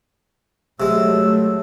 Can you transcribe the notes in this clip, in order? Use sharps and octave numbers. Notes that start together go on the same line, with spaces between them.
C3 F#3 G#3 A3 E6